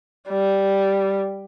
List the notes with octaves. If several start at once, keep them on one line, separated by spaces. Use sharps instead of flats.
G3